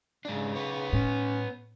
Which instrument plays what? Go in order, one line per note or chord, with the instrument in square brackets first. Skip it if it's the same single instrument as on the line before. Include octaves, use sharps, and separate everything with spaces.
[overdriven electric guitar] G#2 D4 [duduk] C#3
[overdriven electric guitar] B3 C#5
[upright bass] A2 [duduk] C#4